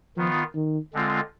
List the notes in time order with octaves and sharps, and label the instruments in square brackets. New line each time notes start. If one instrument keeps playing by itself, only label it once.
[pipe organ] D#3 B3 F4 [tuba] F3
[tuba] D#3
[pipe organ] D3 G#3 C4 F4